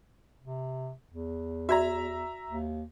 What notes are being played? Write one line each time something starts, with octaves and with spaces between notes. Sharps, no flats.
C3
E2
F#4 D5 E5 A#5
D#2